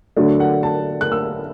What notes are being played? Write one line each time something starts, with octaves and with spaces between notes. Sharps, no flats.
D3 F#3 A3 D4
F#5
A5
F#6
E6